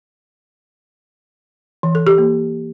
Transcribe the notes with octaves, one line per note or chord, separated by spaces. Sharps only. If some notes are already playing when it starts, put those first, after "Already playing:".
E3
A4
G4
A#3